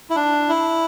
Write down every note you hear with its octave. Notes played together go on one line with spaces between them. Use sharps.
E4
D4
E4